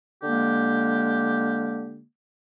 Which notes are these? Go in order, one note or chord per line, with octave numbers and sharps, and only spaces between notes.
D3 G#3 A#3 G4